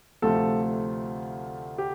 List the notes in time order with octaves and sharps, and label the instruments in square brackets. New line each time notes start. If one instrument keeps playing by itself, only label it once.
[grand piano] D2 C3 F3 A3 F4 A4
G4